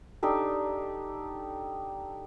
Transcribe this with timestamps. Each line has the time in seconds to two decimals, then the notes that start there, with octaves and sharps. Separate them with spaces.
0.23 D4 D#4 G4 A4